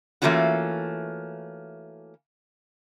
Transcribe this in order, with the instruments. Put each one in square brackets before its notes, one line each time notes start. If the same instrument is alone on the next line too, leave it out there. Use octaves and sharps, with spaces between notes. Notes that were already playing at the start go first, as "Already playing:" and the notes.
[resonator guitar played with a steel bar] E3 A3 A#3 C#4 F4 F#4